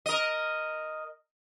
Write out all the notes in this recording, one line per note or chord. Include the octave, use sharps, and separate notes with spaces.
A#4 D#5